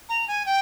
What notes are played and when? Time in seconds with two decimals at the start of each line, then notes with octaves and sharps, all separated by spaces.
0.09 A#5
0.28 G#5
0.46 G5